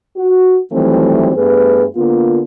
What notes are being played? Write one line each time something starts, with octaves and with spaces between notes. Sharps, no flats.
F#4
D#3 E3 F#3 G3 A3 C4
G2 A3 B3 G#4 B4
D3 A#3 B3 F4